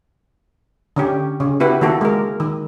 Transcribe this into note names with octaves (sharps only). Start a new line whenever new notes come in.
D3 C#4 G4
C#3 C#4
B3 E4 F#4 G4 B4
D#3 A#3 F#4 A4
G#3 A#4
D#3